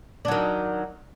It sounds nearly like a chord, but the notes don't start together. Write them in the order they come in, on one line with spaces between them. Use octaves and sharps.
D4 F#3 D#3